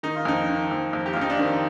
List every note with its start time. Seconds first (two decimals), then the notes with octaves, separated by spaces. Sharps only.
0.03 D#3 D#4
0.15 F4
0.25 F2 D#4
0.49 D#3
0.71 F2
0.93 F2
1.06 G4
1.13 F4
1.17 F2 D#4
1.30 D4
1.39 D#3 C4